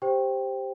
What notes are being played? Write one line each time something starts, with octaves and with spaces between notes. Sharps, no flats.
G4 C5 G5